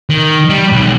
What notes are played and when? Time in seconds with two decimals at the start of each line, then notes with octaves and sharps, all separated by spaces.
0.10 D#3
0.50 G3
0.72 B1